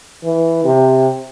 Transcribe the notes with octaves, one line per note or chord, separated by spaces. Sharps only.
E3
C3